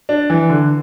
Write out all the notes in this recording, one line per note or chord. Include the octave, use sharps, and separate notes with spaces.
D4
E3
D3